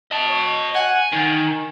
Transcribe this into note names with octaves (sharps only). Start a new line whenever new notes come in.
D#5 A5
C#5
F#5 G#5
D#3 G#5